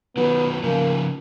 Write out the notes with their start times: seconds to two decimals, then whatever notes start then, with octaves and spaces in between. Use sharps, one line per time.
0.17 D#3 F#3 B3
0.63 C#3 F3 A#3